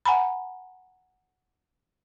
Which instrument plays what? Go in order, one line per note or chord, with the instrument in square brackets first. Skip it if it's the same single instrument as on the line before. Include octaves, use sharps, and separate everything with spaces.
[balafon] F#5 G#5 A#5 B5